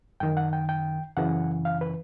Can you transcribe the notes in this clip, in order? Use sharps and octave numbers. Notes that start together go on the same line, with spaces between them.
F#2 D#3 G5
F#5
G5
G5
F#2 C#3 E3 F#5
F5
B4